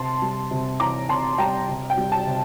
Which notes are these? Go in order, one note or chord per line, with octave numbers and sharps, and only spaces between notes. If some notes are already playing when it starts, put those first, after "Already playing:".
Already playing: C3 A5 C6
G3
C3
E3 A#5 D6
C3 A5 C6
G3 G5 A#5
C3
G5
G3
A5
C3